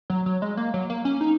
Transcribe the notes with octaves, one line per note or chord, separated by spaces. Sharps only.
F#3
F#3
G#3
A#3
F#3
A#3
C#4
D#4